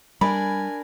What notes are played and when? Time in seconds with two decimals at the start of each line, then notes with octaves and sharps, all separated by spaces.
0.21 G3 D4 A#4 D5 G#5 B5